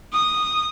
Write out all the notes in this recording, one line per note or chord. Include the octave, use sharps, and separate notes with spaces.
D#6